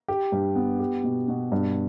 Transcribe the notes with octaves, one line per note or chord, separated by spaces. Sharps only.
G4
G2
B3
G4
B2
B2
G2